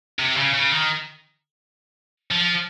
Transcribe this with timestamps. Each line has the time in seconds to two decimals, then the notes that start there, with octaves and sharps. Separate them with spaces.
0.19 C3
0.37 C#3
0.54 C#3
0.72 D#3
2.31 F3